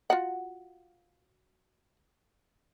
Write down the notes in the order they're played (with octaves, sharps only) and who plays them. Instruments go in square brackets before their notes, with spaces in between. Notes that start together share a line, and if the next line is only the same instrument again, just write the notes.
[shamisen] F4 F#4 F#5